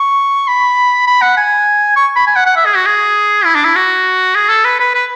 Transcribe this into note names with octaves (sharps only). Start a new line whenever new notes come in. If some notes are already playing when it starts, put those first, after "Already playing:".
Already playing: C#6
B5
B5
F#5
G#5
C#6
B5
G#5
F#5
F#5
E5
G#4
F#4
G#4
E4
D4
E4
F#4
G#4
A4
B4
B4
B4